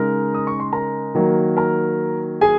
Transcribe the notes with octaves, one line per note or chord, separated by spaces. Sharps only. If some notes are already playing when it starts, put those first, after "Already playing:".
Already playing: C#3 G#3 D#4 A#4 A#5
D#6
C#6
C6
A#4 A#5
D#3 F#3 A#3
A#4 A#5
G#4 G#5